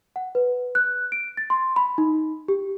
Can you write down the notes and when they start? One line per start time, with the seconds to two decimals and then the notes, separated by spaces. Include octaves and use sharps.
0.16 F#5
0.35 B4
0.75 F#6
1.12 D7
1.37 A6
1.50 C6
1.76 B5
1.98 D#4
2.48 G4